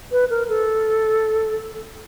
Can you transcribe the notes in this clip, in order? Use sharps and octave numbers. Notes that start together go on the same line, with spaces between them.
B4
A#4
A4